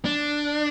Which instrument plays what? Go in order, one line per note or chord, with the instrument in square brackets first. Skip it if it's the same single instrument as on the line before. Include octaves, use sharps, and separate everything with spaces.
[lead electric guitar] D4